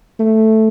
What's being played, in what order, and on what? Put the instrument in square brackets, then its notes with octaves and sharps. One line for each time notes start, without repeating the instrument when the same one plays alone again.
[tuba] A3